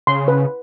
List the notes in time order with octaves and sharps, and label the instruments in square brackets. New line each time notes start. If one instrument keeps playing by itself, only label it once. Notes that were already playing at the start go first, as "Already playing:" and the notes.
[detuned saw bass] C#3 [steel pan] C6
[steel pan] B4